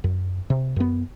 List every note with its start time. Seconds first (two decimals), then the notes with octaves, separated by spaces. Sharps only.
0.04 F#2
0.50 C3
0.76 F#2 B3